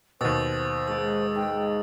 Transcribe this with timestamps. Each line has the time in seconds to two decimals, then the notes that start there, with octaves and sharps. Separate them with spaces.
0.21 D#2 B2 C5 D#6 E6 A6
0.88 G#2 D6 E6
1.36 G#2 G5